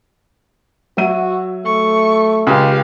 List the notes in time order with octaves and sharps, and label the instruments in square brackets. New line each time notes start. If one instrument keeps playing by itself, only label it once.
[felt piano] F#3 E5 D#7 [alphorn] F#4
[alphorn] A3 [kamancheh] C#6
[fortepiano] C#2 [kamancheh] G4 F5